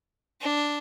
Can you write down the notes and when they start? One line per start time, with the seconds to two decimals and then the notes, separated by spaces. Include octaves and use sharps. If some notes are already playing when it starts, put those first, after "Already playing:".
0.41 D4